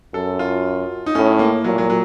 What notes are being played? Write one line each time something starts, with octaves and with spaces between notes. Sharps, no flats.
F#2 A4
F4
D#4
A2 C#4
A#3
A#2 F#3
F#3
F#3